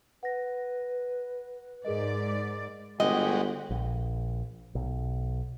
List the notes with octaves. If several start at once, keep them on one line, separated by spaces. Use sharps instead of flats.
B4 F#5 A#6
G#2 G#4 A#4 D5 D#5
G1 G#3 F#4 G4 D#5
A#1
B1